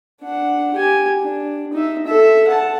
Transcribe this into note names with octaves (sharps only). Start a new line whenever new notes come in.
D4 F#5
G4 G#5
D4
D#4 E5
A4 E5
F#5 A5